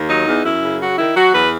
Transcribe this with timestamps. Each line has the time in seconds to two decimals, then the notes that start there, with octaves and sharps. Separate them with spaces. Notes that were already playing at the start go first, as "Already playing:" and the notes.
Already playing: D#2
0.09 F#3 D#4
0.27 E2
0.44 F#2 E4
0.62 C#3
0.80 F#3 F#4
0.98 D#3 E4
1.16 F#3 F#4
1.33 E2 B4